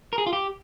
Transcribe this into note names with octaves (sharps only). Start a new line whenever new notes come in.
A#4
G#4
F4
G4